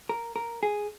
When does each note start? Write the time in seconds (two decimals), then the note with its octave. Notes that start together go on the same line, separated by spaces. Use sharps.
0.09 A#4
0.36 A#4
0.63 G#4